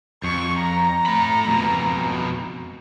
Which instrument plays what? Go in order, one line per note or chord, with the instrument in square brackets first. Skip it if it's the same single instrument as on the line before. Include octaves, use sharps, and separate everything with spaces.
[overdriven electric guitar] F2 [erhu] C#6
[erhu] A#5
[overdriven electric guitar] A3 B5
F2 B2